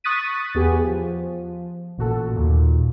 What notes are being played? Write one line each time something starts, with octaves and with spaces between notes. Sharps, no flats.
C#6 D#6 F#6 A6 B6 D#7
E2 B3 G4 G#4 G#5
F3
A1 A#2 F#4 A4
D#2 A#2